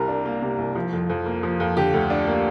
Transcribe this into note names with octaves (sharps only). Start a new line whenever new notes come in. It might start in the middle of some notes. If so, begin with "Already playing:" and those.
Already playing: C2 C3 A#4
D4
A#3
C3
C2
F3
F2
F2
A#3
F3
F2
D3 G4
D2
D4
A#3